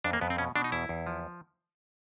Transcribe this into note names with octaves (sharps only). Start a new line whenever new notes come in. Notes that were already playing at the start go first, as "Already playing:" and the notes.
F2 D4
A#3
F2 B3
C4
B2 C#4
B2 D4
D#4
E2 E4
E2
F3